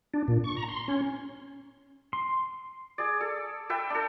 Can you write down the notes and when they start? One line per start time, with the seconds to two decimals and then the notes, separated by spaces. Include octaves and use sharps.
0.14 D4
0.28 A#2
0.44 C#6
0.56 A#5
0.69 C6
0.88 C#4
2.13 C6
2.98 G#4 D5
3.21 A4
3.69 A4 B4 E5 G5
3.90 D4 A4